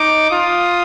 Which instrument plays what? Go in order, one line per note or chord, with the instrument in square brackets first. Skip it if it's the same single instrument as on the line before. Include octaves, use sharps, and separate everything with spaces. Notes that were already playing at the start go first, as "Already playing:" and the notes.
Already playing: [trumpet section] D#4 [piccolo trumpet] D6
[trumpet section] F4 [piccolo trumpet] D#6